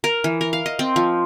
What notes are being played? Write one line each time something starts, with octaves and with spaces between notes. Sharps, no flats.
A#4
E3
A#4
F5
D#5
C4
F3